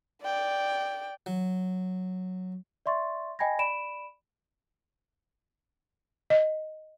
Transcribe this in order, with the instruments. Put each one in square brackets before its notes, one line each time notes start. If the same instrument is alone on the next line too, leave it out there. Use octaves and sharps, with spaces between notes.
[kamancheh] D5 G5
[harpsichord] F#3
[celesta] D5 E5 C6 C#6 A6
D#5 G5 G#5 B5 G#6 A#6
D5 B5 D7 E7
[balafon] D#5